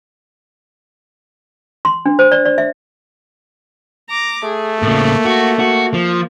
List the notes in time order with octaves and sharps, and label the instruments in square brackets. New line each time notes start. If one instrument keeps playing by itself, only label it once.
[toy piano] C6
D4
C5
D5
D5
E5
[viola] A#5 D6
[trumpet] A3 [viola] G#4
[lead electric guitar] A2 C#3 [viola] A#3
[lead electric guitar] F#4
F#4
F3